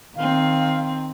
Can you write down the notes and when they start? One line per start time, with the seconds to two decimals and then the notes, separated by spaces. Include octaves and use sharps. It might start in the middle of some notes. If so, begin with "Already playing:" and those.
0.16 D#3 C4 F5